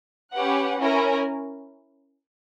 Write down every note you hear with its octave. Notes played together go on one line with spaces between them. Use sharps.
C#4 G4 B4 F#5
C#4 E4 A#4